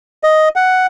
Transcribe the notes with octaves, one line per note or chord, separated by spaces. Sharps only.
D#5
F#5